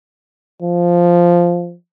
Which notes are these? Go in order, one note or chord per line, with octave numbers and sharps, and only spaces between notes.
F3